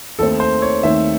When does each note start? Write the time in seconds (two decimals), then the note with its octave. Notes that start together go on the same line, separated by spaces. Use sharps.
0.19 D#2 D#3 A3 C4 A4
0.40 C5
0.62 C#5
0.83 D#2 D#3 A3 C4 E5